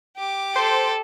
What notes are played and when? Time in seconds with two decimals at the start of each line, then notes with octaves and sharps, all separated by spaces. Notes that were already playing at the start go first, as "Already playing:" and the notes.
0.16 G4 D6
0.56 A4 C5